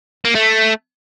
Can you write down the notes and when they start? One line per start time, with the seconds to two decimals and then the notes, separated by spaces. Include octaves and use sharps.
0.25 A#3
0.35 A3